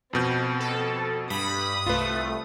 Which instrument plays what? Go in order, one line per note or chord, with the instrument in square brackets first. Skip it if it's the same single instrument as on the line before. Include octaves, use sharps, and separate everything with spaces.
[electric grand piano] F2 B2 G6 [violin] C4
[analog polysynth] A4
[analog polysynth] G2 B5 [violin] D#6
[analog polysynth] C2 A3 [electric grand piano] F4 B4